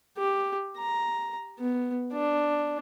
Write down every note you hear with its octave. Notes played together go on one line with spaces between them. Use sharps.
G4
A#5
B3
D4